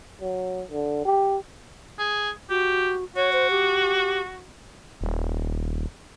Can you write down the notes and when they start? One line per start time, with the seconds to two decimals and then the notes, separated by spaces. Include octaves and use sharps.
0.21 F#3
0.71 D3
1.05 G4
1.99 G#4
2.50 F#4 G4
3.16 F#4 C#5
3.33 C5
3.50 G4
5.01 D#1